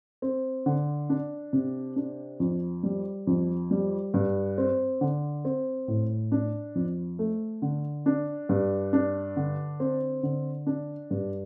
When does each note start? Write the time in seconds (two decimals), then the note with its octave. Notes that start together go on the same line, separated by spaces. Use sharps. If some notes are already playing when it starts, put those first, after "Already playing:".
0.22 C4
0.66 D3
1.10 D4
1.53 C3
1.96 D4
2.40 F2
2.83 G3
3.27 F2
3.71 G3
4.14 G2
4.58 C4
5.01 D3
5.45 C4
5.88 A2
6.32 D4
6.75 F2
7.19 A3
7.62 D3
8.06 D4
8.49 G2
8.93 D4
9.36 D3
9.80 C4
10.23 D3
10.67 D4
11.11 G2